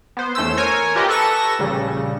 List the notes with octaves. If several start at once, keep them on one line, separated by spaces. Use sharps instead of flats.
B3 C5
E2 A3 C#4 C5 E6
A#4 C#5 G#5
F4 G4 A#4 B4 D#5
A4 B4 C#6 A#6 E7
A#1 C#3 G3